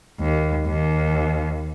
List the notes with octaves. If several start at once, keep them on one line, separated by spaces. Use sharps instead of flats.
D#2
D#2